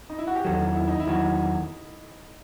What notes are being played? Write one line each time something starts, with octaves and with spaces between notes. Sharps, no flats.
D#4
E4
F#4
G4
E2 D#3 F#3 A4
E4
D#4
E4
E2 D#3 F#3